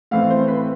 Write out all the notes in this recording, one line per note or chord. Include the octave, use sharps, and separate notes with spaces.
A2 E3 A3 C4 F5
C5
B4